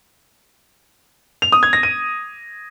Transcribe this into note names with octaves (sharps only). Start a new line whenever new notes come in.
F7
D#6
G#6
A#6
D#7